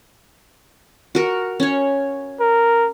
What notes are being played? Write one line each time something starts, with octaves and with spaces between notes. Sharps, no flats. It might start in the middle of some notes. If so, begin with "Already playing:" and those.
F#4 A#4
C#4 C#5
A#4